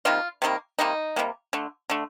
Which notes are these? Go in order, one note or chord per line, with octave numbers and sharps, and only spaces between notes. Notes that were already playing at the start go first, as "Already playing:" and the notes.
C3 D#3 G3 A#3 F4
C3 D#3 G3 A#3
C3 D#3 G3 A#3 D#4
C3 D#3 G3 A#3
D3 A3
D3 A3